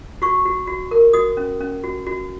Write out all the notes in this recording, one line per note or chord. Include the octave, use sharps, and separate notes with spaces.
F#4 C#6
F#4
F#4
A#4
F#4 D#6
C#4
C#4
F#4
F#4